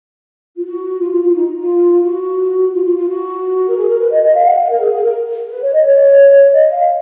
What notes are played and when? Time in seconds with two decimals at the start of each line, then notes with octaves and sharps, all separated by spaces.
0.56 F4
0.65 F#4
0.99 F4
1.12 F4
1.22 F4
1.34 D#4
1.58 F4
2.04 F#4
2.73 F4
2.85 F4
2.96 F4
3.08 F#4
3.69 A#4
3.76 G#4
3.88 A#4
3.99 B4
4.11 D#5
4.23 D#5
4.35 F5
4.46 F#5
4.58 F5
4.69 A#4
4.80 G#4
4.93 G#4
5.04 A#4
5.49 B4
5.62 C#5
5.73 D#5
5.84 C#5
6.53 D#5
6.71 F5